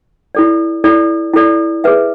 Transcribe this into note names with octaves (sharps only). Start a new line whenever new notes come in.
E4 A4 D5
E4 A4 D5
E4 A4 D5
G#4 B4 E5